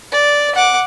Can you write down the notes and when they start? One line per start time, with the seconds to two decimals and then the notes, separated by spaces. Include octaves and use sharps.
0.12 D5
0.55 F#5 D6